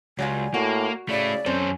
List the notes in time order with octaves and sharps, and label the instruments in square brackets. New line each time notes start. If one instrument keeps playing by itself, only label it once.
[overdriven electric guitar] C#2 [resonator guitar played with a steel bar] F#3 G3 F4 [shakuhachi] G#5
[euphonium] A2 [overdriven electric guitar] A#3 [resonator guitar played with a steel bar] F#4
[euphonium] C#3 [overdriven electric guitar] A3 E4 [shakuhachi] D5
[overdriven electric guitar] F#2 A4 [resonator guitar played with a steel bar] C4 C5 [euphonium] C#4